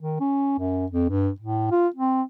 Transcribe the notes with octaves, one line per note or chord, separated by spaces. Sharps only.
D#3
C#4
F#2
F2
G2
A2
F4
C4